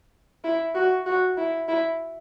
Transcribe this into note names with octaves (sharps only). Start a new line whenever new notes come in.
E4
F#4
F#4
E4
E4